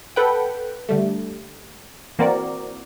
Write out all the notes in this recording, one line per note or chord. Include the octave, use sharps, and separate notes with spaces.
A4 B4 F#5 G5
D3 G3 A3
E3 A#3 C4 F#4 A#4 D5